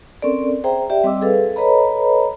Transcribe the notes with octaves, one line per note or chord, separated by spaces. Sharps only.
C4 C#4 A4 A#4 D5
G#4 C5 E5 G5 A#5
G4 D5 E5 G5
G3 C4 D#5 G5 D6 E6
G#4 A4 B4 F5
A4 B4 C#5 D#5 A#5 B5